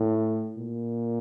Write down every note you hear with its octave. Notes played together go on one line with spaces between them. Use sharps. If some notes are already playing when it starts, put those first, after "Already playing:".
Already playing: A2
A#2